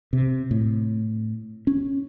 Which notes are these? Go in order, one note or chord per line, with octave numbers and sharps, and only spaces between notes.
C3
A2
C#4